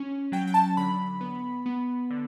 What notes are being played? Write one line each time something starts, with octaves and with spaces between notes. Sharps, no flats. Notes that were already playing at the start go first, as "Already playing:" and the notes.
Already playing: C#4
F#3 G5
G5
A5
D3 B5
B3
B3
D3